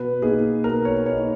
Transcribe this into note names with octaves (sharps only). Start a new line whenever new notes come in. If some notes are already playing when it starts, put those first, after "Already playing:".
Already playing: B2 B4
A#3 D#4 G#4
B2 A#4
C#5
A#3 C#5
D#4